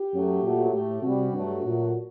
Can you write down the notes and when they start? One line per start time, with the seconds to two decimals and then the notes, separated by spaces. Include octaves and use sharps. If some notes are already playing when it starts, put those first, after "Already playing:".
Already playing: G4
0.12 F#2 F#3 A3
0.42 A#2 F#3 A3
0.72 A2 A3 G4
1.03 C3 G3 F#4
1.32 G2 F#3 A3
1.63 A#2 F#3 A3